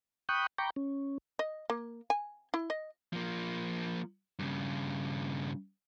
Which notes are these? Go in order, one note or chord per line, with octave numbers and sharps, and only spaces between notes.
G5 B5 C#6 D#6 F#6 G6
G5 A#5 B5 C#6 D6 G6
C#4
D#5
A#3
G#5
E4
D#5
F3 A#3
G2 C#3